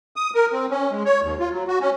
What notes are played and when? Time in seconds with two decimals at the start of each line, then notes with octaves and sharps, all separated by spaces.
0.16 D#6
0.35 A#4
0.52 C4
0.70 C#4
0.91 G#3
1.05 C#5
1.22 D#2
1.39 F4
1.52 F#3
1.67 F#4
1.81 C#4